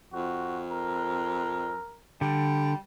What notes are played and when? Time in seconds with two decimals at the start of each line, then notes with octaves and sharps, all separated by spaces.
0.13 F2 F#4
0.71 A#4
2.21 D3 G3